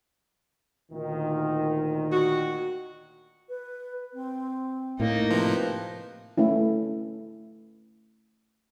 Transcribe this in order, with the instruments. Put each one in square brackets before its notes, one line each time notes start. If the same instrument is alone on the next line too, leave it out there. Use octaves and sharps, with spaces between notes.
[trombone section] D2 A#2 D#3
[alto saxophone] F#4
[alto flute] B4
C4
[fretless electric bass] A2 [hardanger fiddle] A#3 D#4
[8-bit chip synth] C3 F3 [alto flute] B4
[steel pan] A3 C#4 E4